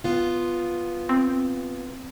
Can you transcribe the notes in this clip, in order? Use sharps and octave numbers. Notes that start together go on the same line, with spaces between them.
B3 F4
C4